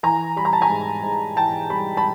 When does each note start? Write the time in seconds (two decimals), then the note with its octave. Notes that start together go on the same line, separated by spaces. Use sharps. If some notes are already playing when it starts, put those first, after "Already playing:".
0.03 E3 G#5 A#5
0.36 G3 B5
0.45 A#5
0.53 A5
0.61 G#5 A#5
0.70 G#2
1.03 G#2
1.37 E3 G5 A5
1.70 G3 B5
1.97 A5 B5